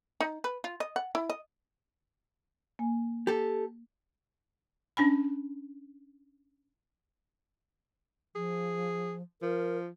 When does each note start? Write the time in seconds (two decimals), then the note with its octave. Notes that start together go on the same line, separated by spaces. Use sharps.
0.20 D#4
0.44 B4
0.64 F4
0.80 D#5
0.96 F#5
1.15 E4
1.30 D#5
2.79 A#3 G#5
3.27 G4 A4
4.97 C#4 D4 G#5 B5
8.35 F3 G#4
9.42 F3 A#4